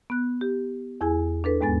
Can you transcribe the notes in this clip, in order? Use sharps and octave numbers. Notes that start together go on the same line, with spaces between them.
B3 F#6
G4
E2 E4 G#4 G#5
D4 A4 B4
D#2 G#2 G#3 B3 G#5 A6